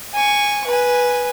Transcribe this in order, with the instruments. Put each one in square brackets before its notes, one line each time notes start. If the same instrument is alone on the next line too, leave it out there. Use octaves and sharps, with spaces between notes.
[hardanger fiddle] G#5 C#6
B4 G#5